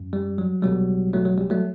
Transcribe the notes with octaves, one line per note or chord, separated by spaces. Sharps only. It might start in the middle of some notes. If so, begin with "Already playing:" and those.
Already playing: F#2
G3
F#3
B1 B2 F#3 G3
F#3 A3
F#3
G3
F#3 A3